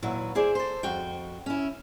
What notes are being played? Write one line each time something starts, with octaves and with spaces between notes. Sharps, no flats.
D#2 A#2 F#3 E4 F#4 B4
E4 G#4 C5 D5
A4 C5
F2 F#4 G5
C#4 E4